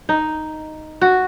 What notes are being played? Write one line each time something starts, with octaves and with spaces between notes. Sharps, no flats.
D#4
F#4